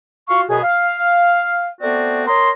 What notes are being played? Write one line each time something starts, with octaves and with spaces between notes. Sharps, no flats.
F4 F#4 F5 C6 C#6
F#2 B2 B3 G#4
F5
A3 B3 C4 F#4 D5
A#4 C#5 D#5 A#5 C6